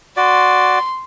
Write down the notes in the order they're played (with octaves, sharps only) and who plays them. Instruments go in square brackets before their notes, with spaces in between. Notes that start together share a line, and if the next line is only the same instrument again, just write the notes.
[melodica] F#4 D5 [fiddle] C6